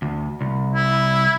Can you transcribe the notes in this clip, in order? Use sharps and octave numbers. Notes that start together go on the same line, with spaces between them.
D2
C2
E4